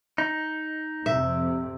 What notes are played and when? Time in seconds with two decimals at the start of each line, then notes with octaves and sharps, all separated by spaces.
0.18 D#4
1.06 F2 C3 E5